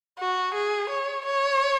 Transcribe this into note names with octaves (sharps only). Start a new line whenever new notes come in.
F#4
G#4
C#5
C#5